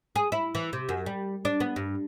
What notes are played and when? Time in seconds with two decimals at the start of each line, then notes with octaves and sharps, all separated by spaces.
0.16 G#4
0.32 E4
0.55 E3
0.73 C3
0.89 F#2
1.06 G3
1.45 D4
1.60 B3
1.76 G2